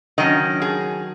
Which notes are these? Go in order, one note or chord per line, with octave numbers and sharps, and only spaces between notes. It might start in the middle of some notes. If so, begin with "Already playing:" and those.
D#3 F#3 C#4 D#5
G#4